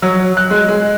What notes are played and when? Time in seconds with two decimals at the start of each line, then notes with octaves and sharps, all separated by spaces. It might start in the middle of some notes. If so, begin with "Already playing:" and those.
0.02 F#3
0.37 F#6
0.51 G#3
0.69 G#3